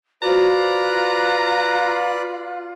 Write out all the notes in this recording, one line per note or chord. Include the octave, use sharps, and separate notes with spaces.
F4 F#4 B4 C5 D5 A#5 F#6